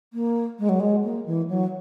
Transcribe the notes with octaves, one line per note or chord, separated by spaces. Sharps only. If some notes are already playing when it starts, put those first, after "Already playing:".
A#3
G#3
F#3
G#3
A#3
E3
F#3